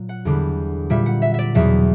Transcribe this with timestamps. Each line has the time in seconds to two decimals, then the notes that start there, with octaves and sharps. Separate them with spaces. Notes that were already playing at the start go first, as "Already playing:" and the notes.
Already playing: A#2 F#3
0.09 F#5
0.25 E2 D3 G3
0.90 A#2 G3 E5
1.06 F#5
1.22 E5
1.34 D5 E5
1.55 E2 B2 F#3 E5